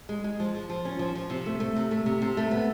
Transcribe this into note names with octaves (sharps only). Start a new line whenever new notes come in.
G#3
G#3
F3
F3
F3
C#4
F3
F3
C3
A3
A3
C3
A3
C3
C3
A3
B3